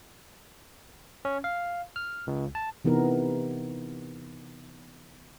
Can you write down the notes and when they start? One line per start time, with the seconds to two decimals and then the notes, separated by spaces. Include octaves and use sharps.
1.25 C#4
1.44 F5
1.96 F6
2.27 C#2
2.55 A5
2.85 C3 E3 B3 D#4 A#4